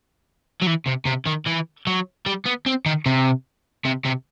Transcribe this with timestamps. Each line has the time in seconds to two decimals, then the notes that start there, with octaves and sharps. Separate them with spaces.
0.62 F#3
0.67 E3
0.87 C3
1.07 C3
1.27 D#3
1.47 E3
1.87 F#3
2.26 G3
2.46 B3
2.66 C4
2.86 D#3
3.06 C3
3.85 C3
4.05 C3